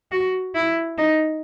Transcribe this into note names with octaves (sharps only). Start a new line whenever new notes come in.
F#4
E4
D#4